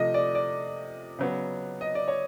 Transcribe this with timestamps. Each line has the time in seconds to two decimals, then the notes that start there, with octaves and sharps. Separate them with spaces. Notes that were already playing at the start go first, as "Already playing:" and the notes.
Already playing: C3 F3 A3 D#5
0.14 D5
0.35 D5
1.19 C#3 F#3 B3
1.81 D#5
1.95 D5
2.08 C#5